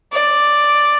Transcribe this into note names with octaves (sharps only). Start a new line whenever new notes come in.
D5